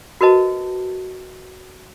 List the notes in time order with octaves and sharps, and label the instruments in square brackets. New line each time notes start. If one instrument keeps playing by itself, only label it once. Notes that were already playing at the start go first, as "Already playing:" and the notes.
[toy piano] F#4 A#4 B4 D#5 A5